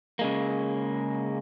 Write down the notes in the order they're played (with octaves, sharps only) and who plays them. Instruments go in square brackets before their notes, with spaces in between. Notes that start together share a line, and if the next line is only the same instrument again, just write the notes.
[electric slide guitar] C#3 G#3 A#3